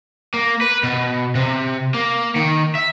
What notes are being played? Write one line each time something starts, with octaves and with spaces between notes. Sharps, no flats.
A#3
B4
B2
C3
A#3
D#3
E5